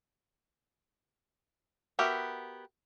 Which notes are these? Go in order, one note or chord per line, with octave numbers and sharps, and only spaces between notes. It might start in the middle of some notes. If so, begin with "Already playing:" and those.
B3 F#4 G4 A#4 E5